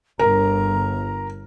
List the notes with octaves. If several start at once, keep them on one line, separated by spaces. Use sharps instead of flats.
G1 A#4 A#5